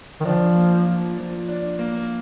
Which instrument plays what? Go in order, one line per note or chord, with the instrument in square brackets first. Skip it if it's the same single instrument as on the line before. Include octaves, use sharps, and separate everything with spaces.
[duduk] D#3
[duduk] F3 [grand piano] D4
[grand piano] A#3
F3
F3
D4
A#3